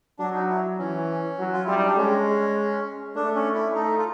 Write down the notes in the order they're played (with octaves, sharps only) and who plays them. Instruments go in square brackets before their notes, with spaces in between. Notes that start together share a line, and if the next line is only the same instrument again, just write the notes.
[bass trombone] F#3 [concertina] D4
[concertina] D#4
E4
[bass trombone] E3 [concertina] C#4
[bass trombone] F#3
[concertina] F4
[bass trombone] G3 [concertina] E4
[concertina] D#4
D4
[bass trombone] G#3 [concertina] C#4
[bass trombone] A3 [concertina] D4
[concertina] C#4
E4
[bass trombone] A3 [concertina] D#4
[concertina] F4